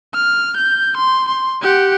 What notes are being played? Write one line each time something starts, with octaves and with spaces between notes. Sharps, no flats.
F6
G6
C6
C6
G4 F#5